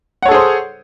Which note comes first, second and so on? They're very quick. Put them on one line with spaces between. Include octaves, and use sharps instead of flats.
F#5 C#5 A4 G#4 C5